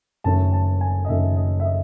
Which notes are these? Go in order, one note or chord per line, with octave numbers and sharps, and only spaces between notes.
F#1 F#2 D#3 A3 C#4 A5
A5
G#5
D#5
F#1 F#2 D#3 A3 C#4 E5
D#5
E5
D#5